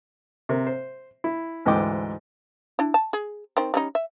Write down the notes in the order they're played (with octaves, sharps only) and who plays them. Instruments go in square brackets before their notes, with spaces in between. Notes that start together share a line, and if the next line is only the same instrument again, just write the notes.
[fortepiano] C3 A#4
C5
E4
D2 G#2 E3 D#5 G5 D6
[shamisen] D4 E4
A5
G#4
D#3 C4
G3 C#4 D#4
E5